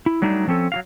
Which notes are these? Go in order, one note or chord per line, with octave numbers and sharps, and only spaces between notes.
E4
F#3 G3 A3 D4 D#4
F3 C4 C#4 A4
F#3 F#4 F5